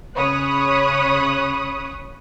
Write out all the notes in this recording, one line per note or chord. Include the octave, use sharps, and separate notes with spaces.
C#3 C#5 B5 D#6 F#6